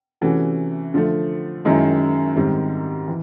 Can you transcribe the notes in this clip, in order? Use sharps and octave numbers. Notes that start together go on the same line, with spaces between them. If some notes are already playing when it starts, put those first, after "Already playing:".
C3 E3 A3 C#4 F#4
D3 F3 A3
F#2 D#3 G#3 C#4 E4
G#2 D#3 G3 C4
E3